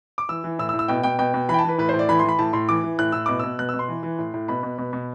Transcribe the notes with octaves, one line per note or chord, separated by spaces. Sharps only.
D6
E3 E6
E3
A2 E6
E6
A2
E6
B2 G5
B2 G5
B2 G5
B2
E3 B5
G5
A5
E3 B4
A2 B4
C5
A2
D5
E3 B5
C6
E3
B5
A2 A5
A2 C6
E3 D6
E3
A2 F#6
A2 E6
B2 D6
B2 E6
B2 F#6
E6
B2
C6
E3
E3
A2
A2
B2 B5
B2
B2
B2